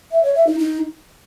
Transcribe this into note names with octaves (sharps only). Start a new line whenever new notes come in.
E5
C#5
E5
D#4
D#4